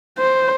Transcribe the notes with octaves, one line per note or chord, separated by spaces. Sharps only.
C5